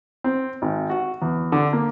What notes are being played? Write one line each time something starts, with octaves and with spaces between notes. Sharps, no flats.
C4
G#1
F#4
E2
D3
A#3